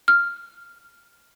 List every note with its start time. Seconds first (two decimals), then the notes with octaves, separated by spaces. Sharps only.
0.08 F6